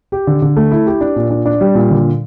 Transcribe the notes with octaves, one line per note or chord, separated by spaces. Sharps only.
G4
D3
D3
A3
E4
G4
D4
A#2
D4
D4
G3
A#2
D3